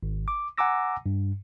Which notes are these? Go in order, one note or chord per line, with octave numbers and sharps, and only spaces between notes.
G#1
D6
F#5 G#5 A#5 D6 E6 A#6
G2